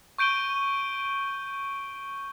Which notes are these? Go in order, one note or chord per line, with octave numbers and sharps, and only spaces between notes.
C#6 G6 D7 D#7 G7